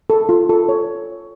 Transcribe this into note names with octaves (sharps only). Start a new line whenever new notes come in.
A4
F4
A4
C#5